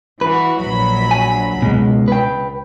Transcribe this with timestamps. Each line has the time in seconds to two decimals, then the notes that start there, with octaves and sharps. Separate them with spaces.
0.21 E3 F#4 B4
0.60 A#1 F#3 B5
1.11 G#5
1.62 C#2 B2 G#3
2.08 B4 G5